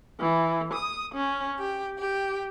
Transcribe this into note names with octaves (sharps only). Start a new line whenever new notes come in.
E3
D#6
C#4
G4
G4